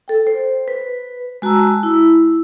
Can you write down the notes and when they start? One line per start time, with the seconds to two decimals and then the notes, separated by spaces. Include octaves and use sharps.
0.08 A4 G5
0.27 C5
0.68 B4
1.42 G#3 F#4 A5 A#5 E6
1.83 E4